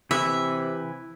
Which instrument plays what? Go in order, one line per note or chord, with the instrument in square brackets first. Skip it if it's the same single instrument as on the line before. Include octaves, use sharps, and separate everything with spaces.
[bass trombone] C3 [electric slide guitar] E3 E4 B4 [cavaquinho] E5